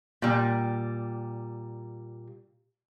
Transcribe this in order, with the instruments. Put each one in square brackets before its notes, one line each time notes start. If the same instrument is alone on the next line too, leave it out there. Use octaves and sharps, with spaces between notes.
[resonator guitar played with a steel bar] A#2 G3